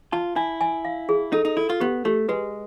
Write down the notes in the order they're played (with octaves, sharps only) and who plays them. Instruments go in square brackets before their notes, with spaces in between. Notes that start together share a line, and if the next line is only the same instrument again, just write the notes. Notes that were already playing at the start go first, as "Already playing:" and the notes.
[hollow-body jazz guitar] F4 [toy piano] A5
[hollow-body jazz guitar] E4 [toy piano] G#5
[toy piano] G#5
F5
G#4
[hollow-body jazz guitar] D#4 [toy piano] A4
[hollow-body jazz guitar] D#4
[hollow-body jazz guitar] E4 [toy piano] A4
[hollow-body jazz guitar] F4
[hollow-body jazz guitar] B3 [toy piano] G4
[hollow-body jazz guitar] A3 [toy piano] G4
[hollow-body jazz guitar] G#3 [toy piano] B4